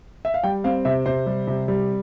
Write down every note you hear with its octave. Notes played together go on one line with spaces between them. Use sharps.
E5
F5
G3 G5
C4 F5
C3 E5
C3 C5
G3
C3
G3